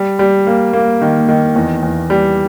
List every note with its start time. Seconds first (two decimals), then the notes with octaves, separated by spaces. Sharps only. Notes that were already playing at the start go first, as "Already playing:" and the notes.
Already playing: G3
0.19 G3
0.47 A#3
0.73 A#3
1.01 D#3
1.29 D#3
1.56 E2
1.83 E2
2.10 G3